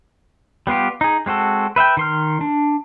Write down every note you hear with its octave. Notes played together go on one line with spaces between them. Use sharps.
G3 B3 F4 G4
D#4 G#4
G#3 C4 F#4 A4
B4 E5 F#5 G5
D#3 C6 F6
D4